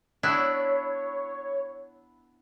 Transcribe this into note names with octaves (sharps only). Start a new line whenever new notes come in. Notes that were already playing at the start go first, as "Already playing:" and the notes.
B3 D4 E4 C#5